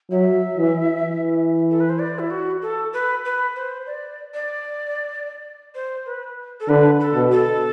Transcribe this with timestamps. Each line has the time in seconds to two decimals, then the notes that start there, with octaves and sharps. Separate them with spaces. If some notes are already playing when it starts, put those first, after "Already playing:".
0.11 F#3 E5
0.58 E3
1.05 E3
1.71 A4
1.80 B4
1.89 C5
1.99 D5
2.19 E4
2.30 F#4
2.62 A4
2.93 B4
3.25 B4
3.56 C5
3.86 D5
4.34 D5
5.75 C5
6.06 B4
6.60 A4
6.68 D3 B4
7.00 A4
7.15 B2
7.31 A4